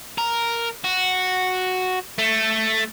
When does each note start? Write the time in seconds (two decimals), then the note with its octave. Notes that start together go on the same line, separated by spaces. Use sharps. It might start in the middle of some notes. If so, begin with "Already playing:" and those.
0.18 A#4
0.84 F#4
2.18 A3